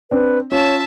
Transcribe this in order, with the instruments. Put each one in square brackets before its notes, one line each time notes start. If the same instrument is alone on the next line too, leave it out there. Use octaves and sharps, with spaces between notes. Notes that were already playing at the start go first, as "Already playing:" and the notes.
[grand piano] C4 D4 [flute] B4
[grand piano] C#4 F4 [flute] C#5 [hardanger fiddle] E5 A5